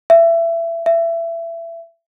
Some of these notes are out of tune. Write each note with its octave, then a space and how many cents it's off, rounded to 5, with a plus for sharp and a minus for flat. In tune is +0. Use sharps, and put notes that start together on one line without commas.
E5 +25
E5 +25